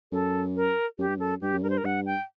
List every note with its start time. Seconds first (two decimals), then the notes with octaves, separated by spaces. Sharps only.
0.12 F#2 A4
0.56 A#4
0.98 F#2 G4
1.08 G2
1.17 F#2 A4
1.41 G2 G4
1.52 F#2
1.62 G2 A#4
1.70 C5
1.78 A#4
1.84 G2 F#5
2.06 G5